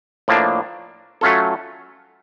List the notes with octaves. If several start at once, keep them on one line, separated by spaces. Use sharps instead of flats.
A2 F3 A#3 D4
F#3 A3 C#4 F4 A4